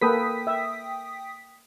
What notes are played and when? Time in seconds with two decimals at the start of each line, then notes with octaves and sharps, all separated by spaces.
0.01 A#3 A4 B4 G5 D#6 B6
0.47 E5